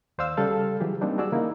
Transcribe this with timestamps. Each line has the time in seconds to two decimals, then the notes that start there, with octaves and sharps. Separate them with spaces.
0.18 D#2 C5 D5 F5 E6
0.37 C#3 G3 A4 F5
0.80 E3 F#3 G4 G#4
1.01 G3 A#3 C4 D4 D#4
1.18 F#4 G#4 D5 E6
1.32 C#3 E3 A#3 D#4 E4